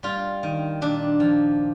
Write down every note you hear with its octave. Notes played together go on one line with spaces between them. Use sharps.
G3 F4
D#3
A#2 D4
F3